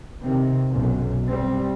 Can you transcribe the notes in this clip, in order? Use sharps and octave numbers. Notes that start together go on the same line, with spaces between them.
C3 D#3 C4
B1 F#2
G3 C4